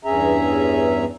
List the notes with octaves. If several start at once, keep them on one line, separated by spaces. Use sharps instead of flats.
E2 G2 C#4 G#4 E5 A#5